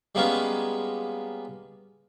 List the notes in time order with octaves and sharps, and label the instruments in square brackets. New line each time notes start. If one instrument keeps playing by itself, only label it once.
[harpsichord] G3 G#3 A#3 B3 C#4 F4